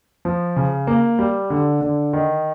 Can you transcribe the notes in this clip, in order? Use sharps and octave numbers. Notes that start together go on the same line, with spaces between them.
F3
C#3
A#3
G3
D3
D3
D#3